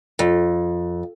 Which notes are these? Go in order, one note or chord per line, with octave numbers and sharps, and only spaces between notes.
F2